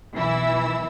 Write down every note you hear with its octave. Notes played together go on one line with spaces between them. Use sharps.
B1 E3 E4 E6